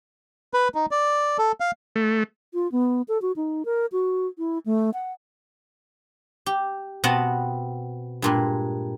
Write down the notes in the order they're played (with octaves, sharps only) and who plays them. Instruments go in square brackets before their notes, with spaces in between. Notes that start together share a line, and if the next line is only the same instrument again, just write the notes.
[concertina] B4
D#4
D5
A4
F5
[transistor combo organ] A3
[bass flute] F4
B3
A4
F#4
D#4
A#4
F#4
E4
A3
F#5
[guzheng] G4
B2 B3 C4 D#5 F#5 A5
G2 A#2 G#3